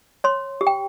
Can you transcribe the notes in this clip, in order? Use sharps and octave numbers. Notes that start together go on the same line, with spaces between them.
C#5 C6
G4
G5